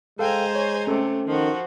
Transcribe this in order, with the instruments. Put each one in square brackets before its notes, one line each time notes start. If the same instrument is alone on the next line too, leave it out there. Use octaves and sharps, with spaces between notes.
[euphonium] G#3 [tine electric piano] A4 F5 G5 [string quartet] C5 G#5 A#5
[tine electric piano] C#5
[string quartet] C3 A3 [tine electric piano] C#4 A4
[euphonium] D#3 [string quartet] F3 F#4